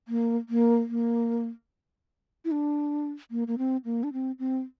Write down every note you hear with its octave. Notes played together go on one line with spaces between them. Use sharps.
A#3
A#3
A#3
E4
D4
A#3
A#3
C4
A#3
D4
C4
C4